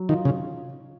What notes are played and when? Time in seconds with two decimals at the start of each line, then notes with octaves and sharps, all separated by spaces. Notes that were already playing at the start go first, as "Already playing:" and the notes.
Already playing: F#3
0.09 D#3 F4
0.25 C#3